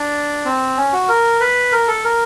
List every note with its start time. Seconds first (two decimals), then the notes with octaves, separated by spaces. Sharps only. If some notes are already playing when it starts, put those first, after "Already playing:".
Already playing: D4
0.45 C4
0.77 C#4
0.93 F#4
1.09 A#4
1.40 B4
1.72 A#4
1.88 A4
2.04 A#4